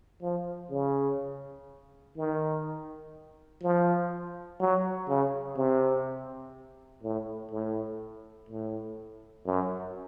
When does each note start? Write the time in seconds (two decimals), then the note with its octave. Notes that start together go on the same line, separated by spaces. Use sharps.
0.22 F3
0.71 C#3
2.17 D#3
3.63 F3
4.60 F#3
5.08 C#3
5.57 C3
7.03 A2
7.51 A2
8.49 A2
9.46 F#2